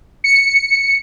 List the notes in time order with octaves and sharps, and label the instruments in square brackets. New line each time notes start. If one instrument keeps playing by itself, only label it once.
[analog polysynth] C#7